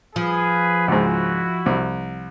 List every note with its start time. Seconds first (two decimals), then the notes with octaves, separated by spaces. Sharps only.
0.16 F3 G#4 B4
0.88 C#2 G#2 E4 F#4
1.66 C2